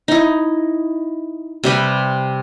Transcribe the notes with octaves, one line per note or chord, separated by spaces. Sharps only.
D#4 E4
C3 G3 G4 B4